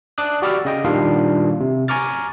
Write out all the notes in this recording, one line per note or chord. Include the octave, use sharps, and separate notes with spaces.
D5 A5 D6 D#6 F#6
F#4 G4 D5 B5 E6 F6
C#3 D#5 G5
A#2 D#3 G3 D4 F4 F5
C3
G#5 A#5 C#6 D6 F6 A6